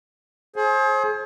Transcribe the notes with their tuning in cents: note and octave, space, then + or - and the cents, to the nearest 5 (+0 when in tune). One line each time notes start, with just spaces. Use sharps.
G#4 +35 C5 +30